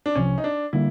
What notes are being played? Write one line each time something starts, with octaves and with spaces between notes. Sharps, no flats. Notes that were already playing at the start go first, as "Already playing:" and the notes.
D4
C2 C3 F3 C#4
D#4
D4
D3 G3 A#3 E4